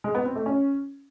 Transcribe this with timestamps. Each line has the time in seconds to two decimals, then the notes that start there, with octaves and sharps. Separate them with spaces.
0.04 G#3
0.15 B3
0.25 C4
0.36 A3
0.46 C#4